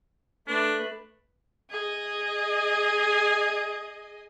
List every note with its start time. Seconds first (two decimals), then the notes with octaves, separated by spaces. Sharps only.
0.47 A3 D4 B4
1.70 G#4 D#5